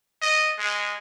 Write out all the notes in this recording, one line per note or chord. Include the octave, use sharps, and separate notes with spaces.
D#5
G#3